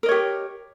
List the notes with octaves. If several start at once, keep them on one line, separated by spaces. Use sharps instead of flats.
G4 A#4 C#5 D#5